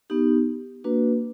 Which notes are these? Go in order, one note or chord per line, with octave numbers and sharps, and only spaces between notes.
B3 D#4 G4
A#3 D4 F#4 B4